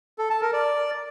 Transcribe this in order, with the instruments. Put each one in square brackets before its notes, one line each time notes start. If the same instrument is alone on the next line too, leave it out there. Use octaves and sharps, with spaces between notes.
[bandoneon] A4
A5
A#4
D5